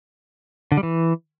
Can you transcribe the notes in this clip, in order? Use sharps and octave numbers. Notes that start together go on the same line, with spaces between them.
D3
G3
E3